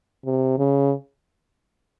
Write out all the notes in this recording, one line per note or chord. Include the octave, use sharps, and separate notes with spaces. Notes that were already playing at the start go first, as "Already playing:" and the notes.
C3
C#3